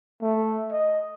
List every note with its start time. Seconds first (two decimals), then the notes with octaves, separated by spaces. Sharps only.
0.22 A3
0.72 D#5